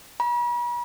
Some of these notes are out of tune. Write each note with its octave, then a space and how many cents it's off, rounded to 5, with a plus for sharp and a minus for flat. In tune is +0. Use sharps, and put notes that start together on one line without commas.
B5 -45